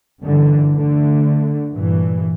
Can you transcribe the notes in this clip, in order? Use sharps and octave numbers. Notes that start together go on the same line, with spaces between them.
G2 D3 E3
D3 A3
G2 A#2 E3